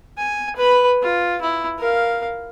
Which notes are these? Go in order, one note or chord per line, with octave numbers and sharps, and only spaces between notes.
G#5
B4 B5
F4
E4
A#4 F5